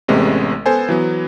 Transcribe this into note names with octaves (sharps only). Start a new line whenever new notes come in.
A1 C3 G#3 A3 B3 C#4
B3 A4 C5 G#5
E3 F#3 B3